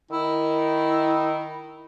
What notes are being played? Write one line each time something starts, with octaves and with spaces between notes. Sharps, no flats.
D#3 E4